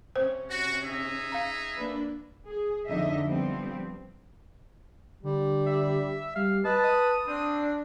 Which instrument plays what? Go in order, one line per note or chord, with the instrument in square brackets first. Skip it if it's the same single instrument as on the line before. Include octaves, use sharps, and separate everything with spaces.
[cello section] C3 C#4 [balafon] C5
[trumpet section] F#4
D#4 G#4 E5
[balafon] F5 A#5
[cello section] A#3 D4 B4
G#4
F2 D3 D#4 D#5 E5
F3 G3 B3 C4
[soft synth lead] D3 [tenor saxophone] G3
[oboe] E5
[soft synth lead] G3 [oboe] F5
[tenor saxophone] B4 [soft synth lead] D#5 [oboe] A5
[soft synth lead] D#6
[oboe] C4 [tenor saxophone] D4